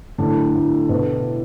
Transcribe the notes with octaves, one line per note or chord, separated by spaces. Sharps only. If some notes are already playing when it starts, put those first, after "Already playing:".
A2 D3 D4
A2
B2